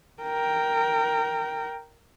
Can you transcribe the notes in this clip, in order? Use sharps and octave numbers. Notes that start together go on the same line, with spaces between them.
A#4 G5